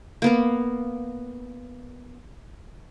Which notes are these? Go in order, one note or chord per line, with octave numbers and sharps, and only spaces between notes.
A#3 B3 A#4